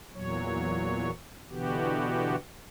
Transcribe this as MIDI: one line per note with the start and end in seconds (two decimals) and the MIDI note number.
0.13 1.10 40
0.13 1.10 46
0.13 1.10 54
0.13 1.10 73
1.50 2.36 47
1.50 2.36 50
1.50 2.36 52
1.50 2.36 59
1.50 2.36 66
1.50 2.36 67